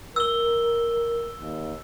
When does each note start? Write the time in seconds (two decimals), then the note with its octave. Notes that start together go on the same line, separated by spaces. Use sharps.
0.16 A#4 E6 G7
1.40 D#2